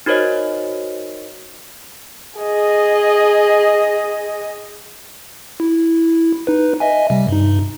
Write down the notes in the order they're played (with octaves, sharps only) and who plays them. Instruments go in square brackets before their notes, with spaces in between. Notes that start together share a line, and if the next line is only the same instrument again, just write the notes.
[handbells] D#4 F#4 A#4 C5 C#5 D#5
[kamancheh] G#4 D#5
[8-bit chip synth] E4
D#4 B4
D#5 E5 G#5
C3 G3
G2 D#4